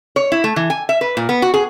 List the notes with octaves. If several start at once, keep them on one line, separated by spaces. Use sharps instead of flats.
C#5
E4
A3
E3
G#5
E5
B4
A#2
B3
F#4
G#4